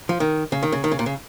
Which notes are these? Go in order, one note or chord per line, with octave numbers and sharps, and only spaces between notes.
F3
D#3
C#3
D#3
C#3
D#3
C#3
A#2
C#3